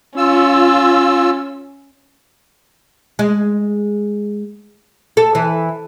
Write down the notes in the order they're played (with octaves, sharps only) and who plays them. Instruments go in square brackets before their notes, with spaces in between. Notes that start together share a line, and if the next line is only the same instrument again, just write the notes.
[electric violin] C#4 [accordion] F4 E6
[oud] G#3
A4
E3